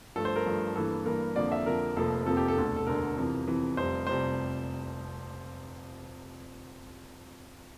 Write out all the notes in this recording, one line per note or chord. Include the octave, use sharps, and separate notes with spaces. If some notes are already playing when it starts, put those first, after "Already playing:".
G2 F3 A3 A4
C5
A#4
G2 F3 A3
G2 E3 A#3 A4
G2 E3 A#3 A#4
F2 D3 F3 A#3 D5
E5
F2 D3 F3 A#3 A#4
F1 F2 C3 F3 A#3 A4
F1 F2 C3 F3 A#3 A4
G4
A4
E1 D2 D3
A4
E1 D2 D3 A#4
F2 C3 E3
F2 C3 E3
F1 F2 C3 G3 C5
F1 F2 C3 G3 C5